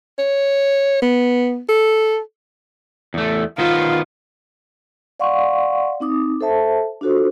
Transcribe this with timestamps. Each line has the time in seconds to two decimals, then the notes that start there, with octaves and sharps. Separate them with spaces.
0.19 C#5
1.02 B3
1.69 A4
3.14 E2 A3
3.58 D#3 B3 F4 C5
5.20 D5 F5 F#5 C6 C#6
6.00 C4 D#4 D6 D#6
6.41 A4 C5 E5 A5
7.01 D4 F4 F#4 A4 C5